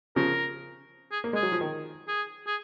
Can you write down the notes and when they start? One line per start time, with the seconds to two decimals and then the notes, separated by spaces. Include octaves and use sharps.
0.16 C#3 F3 A#4
1.12 G#4
1.24 A#3
1.33 G#3 G#4
1.43 F#3
1.52 F3
1.61 D#3
2.08 G#4
2.47 G#4